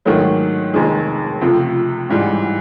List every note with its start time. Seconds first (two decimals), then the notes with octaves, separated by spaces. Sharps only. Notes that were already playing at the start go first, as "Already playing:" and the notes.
0.05 G#2 D#3 F#3 A3
0.74 F1 D#2 D#3 G#3
1.41 C#2 C3 F3 A3
2.09 A1 G#2 E3 G3